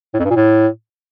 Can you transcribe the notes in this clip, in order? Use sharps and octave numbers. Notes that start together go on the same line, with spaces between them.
A2
F2
G2
A#2
A2